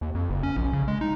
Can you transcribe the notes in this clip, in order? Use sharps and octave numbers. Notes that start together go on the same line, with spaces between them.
D#2
F2
F#1
C#4
A#1
C#3
G#3
D#4